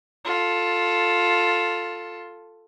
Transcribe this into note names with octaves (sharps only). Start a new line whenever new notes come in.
F4 A4